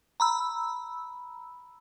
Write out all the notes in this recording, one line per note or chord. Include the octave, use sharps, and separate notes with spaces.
A#5 B5 E6